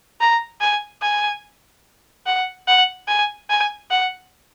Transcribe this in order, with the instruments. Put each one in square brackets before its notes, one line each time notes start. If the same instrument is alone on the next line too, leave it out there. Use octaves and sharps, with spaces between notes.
[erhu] A#5
G#5
G#5
F#5
F#5
G#5
G#5
F#5